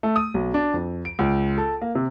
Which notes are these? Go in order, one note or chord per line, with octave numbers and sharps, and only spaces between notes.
A3
D#6
B1
D4
F2
D7
C#2
A4
A#3
C3